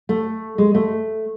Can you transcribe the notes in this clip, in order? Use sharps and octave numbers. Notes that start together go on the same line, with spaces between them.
A3
G#3
A3